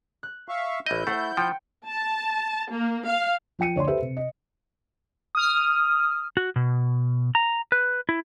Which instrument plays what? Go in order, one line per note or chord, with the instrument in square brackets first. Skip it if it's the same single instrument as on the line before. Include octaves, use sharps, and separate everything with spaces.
[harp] F#6
[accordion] E5 F5 C#6
[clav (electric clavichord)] A1 D#5 [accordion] E4 G6
[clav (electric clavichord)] A3 [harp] C5 F#5
[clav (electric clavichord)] F3 [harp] G5 C#7
[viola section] A5
A#3
F5
[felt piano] F3 F4 G5 C#7 D#7
D2 C#5 D5 C6
G4 A4 B4 C5 E5
C3
D#5
[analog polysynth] D#6 F6
[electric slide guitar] F#4
B2
A#5
B4
E4